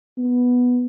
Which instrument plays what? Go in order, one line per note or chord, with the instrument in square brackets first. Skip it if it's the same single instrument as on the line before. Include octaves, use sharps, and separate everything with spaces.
[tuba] B3